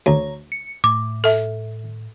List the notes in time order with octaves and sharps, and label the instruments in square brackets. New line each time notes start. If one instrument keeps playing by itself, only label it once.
[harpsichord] D2 [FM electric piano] C#5 A#5
[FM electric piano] C#7
[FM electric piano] A2 [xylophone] D6
[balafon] A4 E5